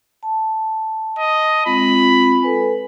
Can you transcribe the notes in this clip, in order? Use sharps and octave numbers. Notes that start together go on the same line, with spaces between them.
A5
D#5
G#3 C4 F4 B5
A4 B4 G#5